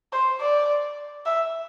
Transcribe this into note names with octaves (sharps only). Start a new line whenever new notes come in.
C5
D5
E5